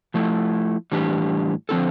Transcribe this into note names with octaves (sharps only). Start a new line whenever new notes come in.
F3 A3 E4
A2 E3 G3 D4 G4
D3 F3 C4 E4 A4